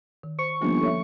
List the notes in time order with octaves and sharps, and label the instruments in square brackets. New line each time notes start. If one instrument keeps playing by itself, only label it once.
[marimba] D#3
[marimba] C5 [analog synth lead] C#6
[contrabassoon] G1 [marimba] F3 A#3 C#4
[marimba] A4 C#5 E5